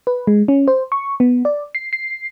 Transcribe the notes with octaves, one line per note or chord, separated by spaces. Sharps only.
B4
G#3
C#4
C5
C#6
B3
D5
C7
C7